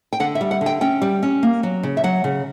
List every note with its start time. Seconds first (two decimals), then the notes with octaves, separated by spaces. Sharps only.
0.13 G5
0.20 D3 F#5
0.35 E5
0.41 G3
0.51 F#5
0.61 D3
0.66 G5
0.81 C#4 G5
1.02 G3
1.23 C#4
1.43 A#3
1.63 F#3
1.83 C#3
1.97 E5
2.04 F#3 F#5
2.24 C#3